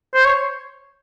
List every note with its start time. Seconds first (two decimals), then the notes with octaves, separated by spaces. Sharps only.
0.14 C5
0.25 C#5